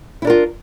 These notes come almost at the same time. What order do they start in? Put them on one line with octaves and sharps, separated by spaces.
E4 D4 A#4 F4